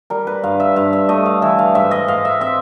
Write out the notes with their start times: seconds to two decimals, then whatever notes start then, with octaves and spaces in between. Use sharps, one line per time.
0.10 G3 A#4
0.27 B4
0.43 G2 F5
0.60 E5
0.76 G2 F5
0.93 E5
1.09 A3 D#5
1.26 F5
1.42 E3 E5
1.59 F5
1.75 G#2 E5
1.91 D#5
2.08 G#2 F5
2.25 E5
2.40 C4 E5